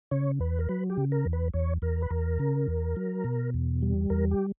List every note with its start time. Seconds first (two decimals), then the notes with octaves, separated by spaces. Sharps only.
0.11 C#3 C#5
0.40 E2 B4
0.59 A#4
0.69 F#3 B4
0.90 G4
0.97 C#3
1.12 A#4
1.26 E2
1.33 B4
1.53 E2 C#5
1.82 E2 A#4
2.02 B4
2.10 E2 A#4
2.39 C#3
2.68 E2
2.96 F#3
3.24 B2
3.54 E2
3.82 G3
4.10 E2 A#4
4.31 G4